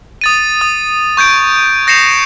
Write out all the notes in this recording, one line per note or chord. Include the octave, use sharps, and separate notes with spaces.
D#6 A6 D#7
D#6
C#6 G6 G#6 D7
G6 A#6 C7 C#7 E7 F7